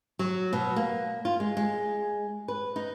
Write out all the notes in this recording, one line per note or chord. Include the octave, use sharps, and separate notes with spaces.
F#3
B2
A#3
F4
G#3
G#3
B4
D#4